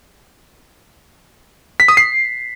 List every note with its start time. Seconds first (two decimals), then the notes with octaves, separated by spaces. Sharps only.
1.80 B6
1.88 D#6
1.97 C7